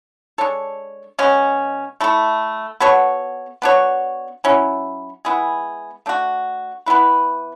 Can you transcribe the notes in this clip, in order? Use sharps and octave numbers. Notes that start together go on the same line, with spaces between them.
G#3 D4 A4 C#5
B2 G#3 C#4
A3 E4 A4
B3 F#4 A4 C#5
B3 D4 F#4 C#5
F#3 C#4 E4
G#3 B3 E4 G#4
A3 D4 F#4
E3 B3 E4 B4